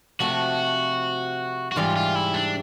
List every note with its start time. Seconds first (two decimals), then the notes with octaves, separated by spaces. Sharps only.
0.20 C3 F3 A3 F#4
1.72 F#4
1.76 G#2 E3 G3 F4
1.96 F4
2.15 E4
2.34 D4